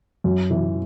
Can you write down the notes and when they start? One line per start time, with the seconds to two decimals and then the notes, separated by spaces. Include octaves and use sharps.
0.24 F#2
0.50 E3